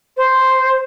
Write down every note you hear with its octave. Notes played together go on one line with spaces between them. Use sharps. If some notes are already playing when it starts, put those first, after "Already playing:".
C5